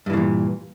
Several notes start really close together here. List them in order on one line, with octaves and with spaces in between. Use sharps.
G2 E3 C#3 A#2